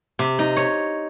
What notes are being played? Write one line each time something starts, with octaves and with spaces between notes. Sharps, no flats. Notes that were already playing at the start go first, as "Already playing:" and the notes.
C3
D#4
C#5